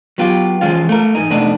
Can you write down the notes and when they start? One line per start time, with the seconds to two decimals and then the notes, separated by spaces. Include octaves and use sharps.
0.18 F#3 B3 F4 G4
0.61 E3 F3 G#3 C#4 F4
0.89 A3 A#4
1.15 G#2 E3 D#4
1.30 F2 C3 A3 B3 D4 D#4